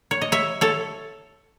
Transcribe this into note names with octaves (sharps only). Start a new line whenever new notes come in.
C#5
D#5
C#5 E5
A4 C#5